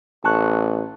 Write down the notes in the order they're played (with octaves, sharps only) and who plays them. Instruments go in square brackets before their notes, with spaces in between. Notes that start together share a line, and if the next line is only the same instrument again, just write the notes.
[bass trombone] A1 [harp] A5 C#6 F#6